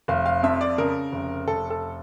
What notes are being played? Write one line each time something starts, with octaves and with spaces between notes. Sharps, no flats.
F1 F5
F5
F2 E5
D5
C#3 A#4
F1
F1 A4
A4